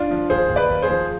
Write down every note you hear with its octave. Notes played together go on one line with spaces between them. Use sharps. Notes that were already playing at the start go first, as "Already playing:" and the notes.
Already playing: D4 F4
F3
D#2 G#4 C5
D#2
B4 D5
D#2
G#4 C5
F3